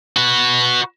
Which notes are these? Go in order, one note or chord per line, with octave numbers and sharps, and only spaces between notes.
F#4 B4